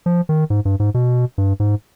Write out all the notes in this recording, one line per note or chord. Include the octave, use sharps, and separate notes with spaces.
F3
D#3
G#2
G2
G#2
B2
G2
G#2